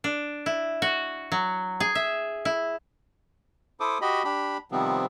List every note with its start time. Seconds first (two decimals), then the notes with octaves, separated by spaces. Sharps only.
0.04 D4
0.46 E4
0.82 F#4
1.32 F#3
1.80 G#4
1.95 E5
2.45 E4
3.80 E4 A4 C5 D6 D#6
4.01 F#4 G4 D#5 B5
4.24 D4 G4 B5
4.72 C3 D#3 F3 G3 B3 C4